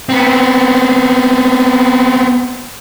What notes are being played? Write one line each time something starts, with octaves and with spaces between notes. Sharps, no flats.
B3 C4